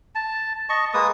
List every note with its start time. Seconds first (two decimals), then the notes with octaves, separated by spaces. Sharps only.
0.15 A5
0.69 D#5 A5 C#6
0.94 G#3 A#3 B4 D#6